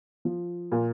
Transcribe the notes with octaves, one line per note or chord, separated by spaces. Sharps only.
F3
A#2